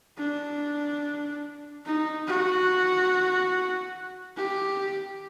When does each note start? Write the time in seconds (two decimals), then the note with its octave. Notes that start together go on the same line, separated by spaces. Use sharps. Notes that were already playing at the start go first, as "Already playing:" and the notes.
0.18 D4
1.86 D#4
2.28 F#4
4.37 G4